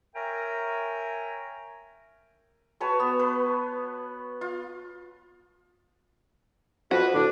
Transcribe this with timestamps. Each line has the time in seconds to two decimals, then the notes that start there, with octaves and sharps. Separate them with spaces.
0.15 A#4 C#5 E5 G5 G#5 A#5
2.80 F#4 B4 C#5 A5
2.99 B3
3.19 B4
4.41 F4
6.91 F2 F3 F#4 B4
7.13 D2 A2 D4